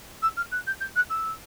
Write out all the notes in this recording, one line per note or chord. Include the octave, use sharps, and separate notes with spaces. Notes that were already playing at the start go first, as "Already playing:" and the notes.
E6
F6
F#6
G6
G6
F#6
E6